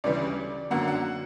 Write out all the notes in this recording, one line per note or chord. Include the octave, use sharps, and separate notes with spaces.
D2 C#3 E3 G3 D5
F#2 D3 F#3 A#3 F#5
F#5